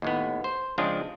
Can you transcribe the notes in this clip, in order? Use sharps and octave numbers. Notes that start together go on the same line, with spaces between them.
D#2 A2 B3
C5
C#3 F3 G#3 C4 D4 F4